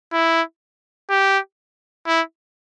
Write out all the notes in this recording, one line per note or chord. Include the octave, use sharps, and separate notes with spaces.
E4
G4
E4